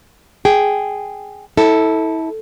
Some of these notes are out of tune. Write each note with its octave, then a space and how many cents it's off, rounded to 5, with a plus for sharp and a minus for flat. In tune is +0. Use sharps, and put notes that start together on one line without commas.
G#4 +0 G5 -10
E4 -30 A4 +0